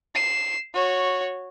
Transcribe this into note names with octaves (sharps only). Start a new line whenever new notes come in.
C7 E7
F#4 C#5